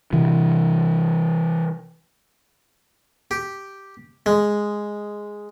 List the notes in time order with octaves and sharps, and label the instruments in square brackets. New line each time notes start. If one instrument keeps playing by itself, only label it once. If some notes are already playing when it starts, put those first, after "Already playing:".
[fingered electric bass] C3 E3
[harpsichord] G4
G#3